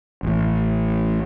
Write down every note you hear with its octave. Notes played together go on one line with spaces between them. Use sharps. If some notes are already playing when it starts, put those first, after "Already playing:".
A1 A2